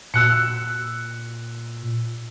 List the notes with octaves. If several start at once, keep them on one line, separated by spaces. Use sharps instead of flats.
A#2 E6 F#6 C#7